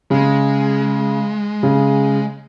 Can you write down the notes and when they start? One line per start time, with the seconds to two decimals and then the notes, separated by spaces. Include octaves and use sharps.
0.10 C#3 G#3
1.63 C#3